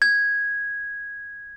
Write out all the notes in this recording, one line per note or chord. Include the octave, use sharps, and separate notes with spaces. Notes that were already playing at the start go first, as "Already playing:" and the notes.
G#6